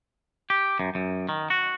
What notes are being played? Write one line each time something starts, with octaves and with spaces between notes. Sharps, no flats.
G4
F#2
F#2
D#3
F#4